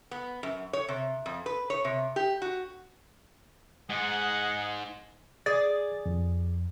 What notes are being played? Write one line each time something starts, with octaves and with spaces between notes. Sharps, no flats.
B3
F#2
C#5
C3
F2
B4
C#5
C3
G4
F#4
G#2 G#4 D#5 F#5
G#4 D5 A6
F2